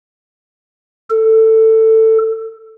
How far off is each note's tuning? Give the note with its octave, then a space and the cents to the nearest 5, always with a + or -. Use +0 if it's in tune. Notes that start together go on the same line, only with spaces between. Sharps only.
A4 +15